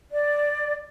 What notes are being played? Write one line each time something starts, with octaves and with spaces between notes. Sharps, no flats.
D5